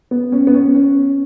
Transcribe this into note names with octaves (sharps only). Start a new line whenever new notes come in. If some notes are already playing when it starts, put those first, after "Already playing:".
B3
C#4
B3
C#4
C#4